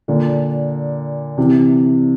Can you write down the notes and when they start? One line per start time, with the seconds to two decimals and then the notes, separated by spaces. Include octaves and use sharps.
0.08 A#2 D3
1.38 C3 E3